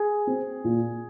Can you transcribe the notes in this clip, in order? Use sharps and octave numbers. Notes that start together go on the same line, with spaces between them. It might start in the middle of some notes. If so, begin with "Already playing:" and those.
Already playing: G#4
C4
A#2